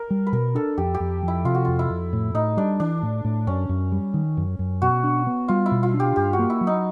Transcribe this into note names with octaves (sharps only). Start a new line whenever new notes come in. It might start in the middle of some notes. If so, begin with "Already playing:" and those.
Already playing: A#4
G3
B4
B2 A#4
D4 A4
F2 G4
G4
F2
F3
E4
C3 F4
F#4
F2 F4
E4
F2
A2
A2 D#4
G3 D4
E3 D4
A2
A2
F#2 C#4
F#2
G3
D#3
F#2
F#2
B2 F#4
D4
B3
G3 F4
E4
B2
F4
D4
G4
G2 G4
F#4
A#3
E4
F#3
D#4